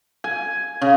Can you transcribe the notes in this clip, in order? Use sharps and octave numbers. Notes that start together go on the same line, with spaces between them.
G#5
C#3